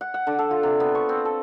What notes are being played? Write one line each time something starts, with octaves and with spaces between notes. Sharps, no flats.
F#5
F#5
D3
A4
F4
C3
B3
C#6
C4
A4